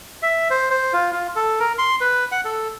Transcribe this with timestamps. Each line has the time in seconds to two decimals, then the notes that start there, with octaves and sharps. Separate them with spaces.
0.23 E5
0.50 C5
0.70 C5
0.93 F4
1.12 F4
1.36 A4
1.60 A#4
1.78 C6
2.01 B4
2.32 F#5
2.45 A4